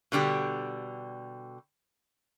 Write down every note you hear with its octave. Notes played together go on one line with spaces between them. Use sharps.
B2 D3 G3 G4